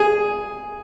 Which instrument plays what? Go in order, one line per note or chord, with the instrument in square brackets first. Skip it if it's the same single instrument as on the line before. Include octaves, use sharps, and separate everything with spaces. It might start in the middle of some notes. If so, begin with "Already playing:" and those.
Already playing: [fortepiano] G#4